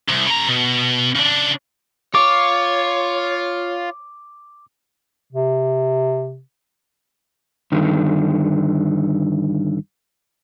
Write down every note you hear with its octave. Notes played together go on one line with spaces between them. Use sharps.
C2
C#3 A#5
B2
C#3 D4
F4 C#5 D6
C3
G2 D3 D#3